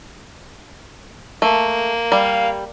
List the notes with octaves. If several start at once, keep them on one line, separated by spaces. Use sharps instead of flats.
A3 A#3
G3 F5